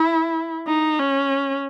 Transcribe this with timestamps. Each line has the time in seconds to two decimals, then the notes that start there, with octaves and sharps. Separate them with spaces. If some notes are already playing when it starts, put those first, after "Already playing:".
Already playing: E4
0.67 D#4
0.99 C#4